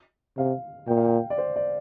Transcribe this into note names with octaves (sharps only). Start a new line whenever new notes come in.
C3 F5
A#2 G5
F5
G5
D5
C5
D5